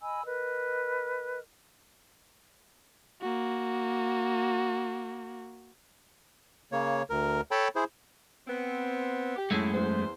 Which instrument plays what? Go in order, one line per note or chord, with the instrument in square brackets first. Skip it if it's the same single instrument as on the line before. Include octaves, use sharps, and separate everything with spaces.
[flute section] D#5 G#5 B5 E6
A#4 B4 D#5
[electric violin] A#3 F#4
[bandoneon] C#3 A#3 C#5
D2 A#4
A4 C#5 G5 A5 B5
E4 G#4 C5
[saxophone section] B3 C4
G4
[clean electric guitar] F#2 G#3 A3 [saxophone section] A2 E4
[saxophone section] E2 C5